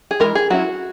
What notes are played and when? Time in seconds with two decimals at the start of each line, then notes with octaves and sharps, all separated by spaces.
0.11 G#4
0.20 E3 G#3 D#4 A#4
0.35 G#4
0.50 F#3 C#4 E4 F#4